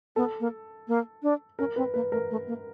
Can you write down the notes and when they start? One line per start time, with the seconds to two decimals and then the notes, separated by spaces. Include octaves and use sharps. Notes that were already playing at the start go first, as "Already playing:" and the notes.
0.16 B3 A4
0.40 A#3
0.88 A#3
1.23 D4
1.59 C#4 A#4
1.76 C4 B4
1.94 A#3 B4
2.12 A3 A#4
2.30 A3
2.47 A#3